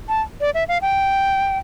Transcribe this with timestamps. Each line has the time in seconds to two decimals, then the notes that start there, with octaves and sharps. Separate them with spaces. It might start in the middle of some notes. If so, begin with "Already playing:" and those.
0.09 A5
0.41 D5
0.54 E5
0.68 F5
0.82 G5